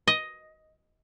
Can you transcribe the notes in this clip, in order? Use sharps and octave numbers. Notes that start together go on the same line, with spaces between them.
D#5